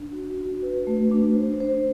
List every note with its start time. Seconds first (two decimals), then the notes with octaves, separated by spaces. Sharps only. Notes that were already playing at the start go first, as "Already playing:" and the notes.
Already playing: D4
0.12 F#4
0.38 F#4
0.62 B4
0.87 A3
1.11 D4
1.35 C5
1.60 C5